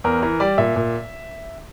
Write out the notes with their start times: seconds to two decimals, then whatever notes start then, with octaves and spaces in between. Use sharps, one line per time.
0.04 E2 A#4
0.22 E3 A#4
0.40 G3 D5
0.58 A#2 E5
0.76 A#2